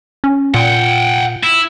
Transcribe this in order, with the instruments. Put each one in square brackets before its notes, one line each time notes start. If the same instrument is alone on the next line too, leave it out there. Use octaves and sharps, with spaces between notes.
[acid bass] C#4
[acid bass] A#2 [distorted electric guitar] F#5 G5
[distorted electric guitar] E4